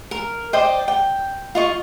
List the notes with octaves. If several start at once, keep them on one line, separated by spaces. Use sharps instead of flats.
A#4
C5 D5 D#5 G5
G5
F4 D#5 C#6